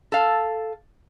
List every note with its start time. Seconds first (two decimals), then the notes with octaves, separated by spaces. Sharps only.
0.12 A4 F5